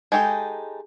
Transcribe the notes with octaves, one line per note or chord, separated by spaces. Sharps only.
G#3 D#4 G4 A4